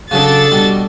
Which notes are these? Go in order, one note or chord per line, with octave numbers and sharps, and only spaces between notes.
C#3 F#3 D4 G#4 A4 A6
B2 G3